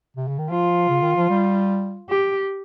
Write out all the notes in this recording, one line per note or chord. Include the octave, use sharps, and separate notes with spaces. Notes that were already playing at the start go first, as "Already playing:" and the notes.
C3
C#3
D#3
F3 F4
C#3
D#3
F3
G3
G4